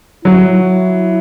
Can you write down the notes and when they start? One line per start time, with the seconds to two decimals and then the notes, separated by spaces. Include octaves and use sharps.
0.24 F#3 E4
0.61 E4